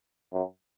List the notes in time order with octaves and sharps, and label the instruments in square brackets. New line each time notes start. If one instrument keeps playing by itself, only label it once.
[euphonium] F#2